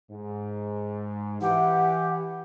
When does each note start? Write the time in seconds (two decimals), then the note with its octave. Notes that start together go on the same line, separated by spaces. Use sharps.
0.11 G#2
1.41 E3 G4 F#5